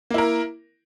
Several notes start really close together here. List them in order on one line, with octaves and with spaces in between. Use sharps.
A#3 E4 A#4